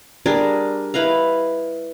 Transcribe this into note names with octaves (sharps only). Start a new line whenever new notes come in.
G3 D4 G#4 A#4
E4 B4 D#5 F5